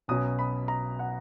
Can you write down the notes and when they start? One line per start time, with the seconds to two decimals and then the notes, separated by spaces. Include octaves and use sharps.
0.08 B1 B2 F#3 C#4 D#6
0.39 B5
0.68 A#5
0.99 F#5